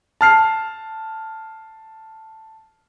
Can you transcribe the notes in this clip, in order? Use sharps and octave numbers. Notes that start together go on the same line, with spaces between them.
A5 F6 C7